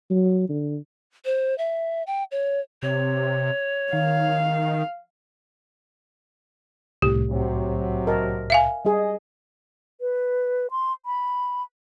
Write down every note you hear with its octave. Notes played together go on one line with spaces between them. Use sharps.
F#3
D3
C5
E5
G5
C#5
C3 C#5
D#3 F5
C2 A2 G4
C3 F#3
A#4 D#5 A5
E5 F5 G#5
G3 G#4 D#5
B4
C6
B5